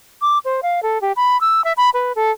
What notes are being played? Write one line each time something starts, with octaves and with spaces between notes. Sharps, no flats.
D6
C5
F5
A4
G4
B5
E6
E5
B5
B4
A4